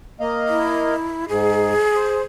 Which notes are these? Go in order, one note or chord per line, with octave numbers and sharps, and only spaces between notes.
A#3 D#5 F5
E4
G#2 G#4
C5